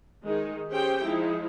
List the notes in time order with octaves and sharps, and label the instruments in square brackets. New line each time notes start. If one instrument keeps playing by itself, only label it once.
[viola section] D#3 G#3 D#4
C#4 G4 G#4 C5 G5
F3 G#3 D#4 E4